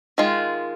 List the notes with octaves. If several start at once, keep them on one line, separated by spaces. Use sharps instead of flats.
D#3 G#3 F4